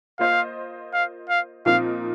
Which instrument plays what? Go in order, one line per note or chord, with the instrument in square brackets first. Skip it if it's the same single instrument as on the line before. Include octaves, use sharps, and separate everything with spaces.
[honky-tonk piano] A#3 F4 C5 D#5 [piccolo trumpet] F5
[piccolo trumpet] F5
F5
[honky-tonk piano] A#2 F3 C4 D#4 A#4 [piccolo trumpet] F5